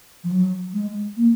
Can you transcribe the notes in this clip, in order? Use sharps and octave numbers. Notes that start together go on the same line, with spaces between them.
F3
F#3
G#3
A#3